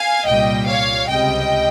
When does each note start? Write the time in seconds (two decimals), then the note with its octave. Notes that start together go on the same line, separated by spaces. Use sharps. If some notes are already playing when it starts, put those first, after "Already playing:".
Already playing: F5 G#5
0.26 C2 A#2 G3 D#5 G5
0.67 C#5 F5
1.08 C#2 C3 G3 D#5 G5